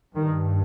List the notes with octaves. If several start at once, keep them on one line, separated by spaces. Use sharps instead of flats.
G2 D#3